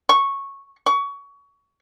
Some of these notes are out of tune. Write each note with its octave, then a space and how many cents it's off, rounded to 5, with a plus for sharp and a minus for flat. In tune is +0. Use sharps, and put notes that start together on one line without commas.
C#6 -10
C#6 +25